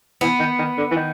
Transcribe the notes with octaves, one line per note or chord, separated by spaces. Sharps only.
E3 B3
D#3
D#3
D3
E3
D#3